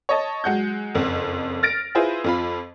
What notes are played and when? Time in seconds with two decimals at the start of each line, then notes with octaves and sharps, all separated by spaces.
0.09 C#5 D#5 A5
0.44 F#3 G#3 F#5 G6
0.94 F#1 F2
1.63 F6 A6 A#6 D7
1.95 E4 F4 G#4 B4 C5
2.24 F2 F4 B5